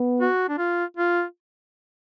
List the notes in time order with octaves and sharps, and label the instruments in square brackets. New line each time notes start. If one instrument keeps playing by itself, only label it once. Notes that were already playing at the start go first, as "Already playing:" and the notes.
Already playing: [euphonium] B3
[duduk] F#4
D4
F4
F4